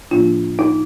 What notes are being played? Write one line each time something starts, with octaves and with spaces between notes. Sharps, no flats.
A2 F3 A#3 D4 F4
D#4